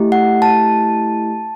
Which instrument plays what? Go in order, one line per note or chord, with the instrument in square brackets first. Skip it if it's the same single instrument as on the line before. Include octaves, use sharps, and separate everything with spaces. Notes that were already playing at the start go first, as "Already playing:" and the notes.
Already playing: [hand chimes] A3 E4 G4
F#5
A5